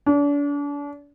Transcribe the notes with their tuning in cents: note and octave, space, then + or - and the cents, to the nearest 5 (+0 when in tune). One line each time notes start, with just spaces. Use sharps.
D4 -35